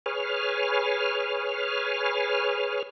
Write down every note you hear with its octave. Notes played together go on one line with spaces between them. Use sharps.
G#4 B4 C#5 F6